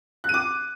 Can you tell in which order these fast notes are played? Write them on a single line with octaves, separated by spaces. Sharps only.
F#6 D#7 D6